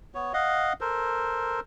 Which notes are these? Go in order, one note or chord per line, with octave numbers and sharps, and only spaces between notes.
B3 C#5
D#5 F5 F#5
A4 A#4 C5